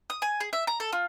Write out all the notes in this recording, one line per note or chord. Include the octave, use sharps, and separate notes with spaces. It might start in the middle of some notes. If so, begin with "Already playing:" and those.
D#6
G#5
G#4
E5
A#5
A4
F4